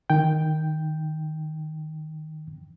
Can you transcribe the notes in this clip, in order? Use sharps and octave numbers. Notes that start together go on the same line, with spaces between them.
D#3 G5